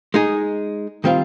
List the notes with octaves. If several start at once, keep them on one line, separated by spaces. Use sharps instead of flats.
G#3 D#4 G#4
D#3 G3 C4 F4